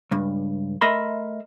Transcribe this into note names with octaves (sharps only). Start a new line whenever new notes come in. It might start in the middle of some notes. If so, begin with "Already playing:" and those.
C#2 G2
A3 A#4 D#5 E5 B5 C6